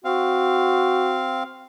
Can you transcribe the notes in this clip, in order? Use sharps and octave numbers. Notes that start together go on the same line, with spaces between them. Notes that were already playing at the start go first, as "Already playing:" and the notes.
C4 F#4 F5